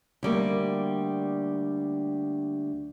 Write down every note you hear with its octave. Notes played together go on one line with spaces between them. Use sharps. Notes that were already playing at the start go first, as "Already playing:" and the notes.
D2 G3 A#3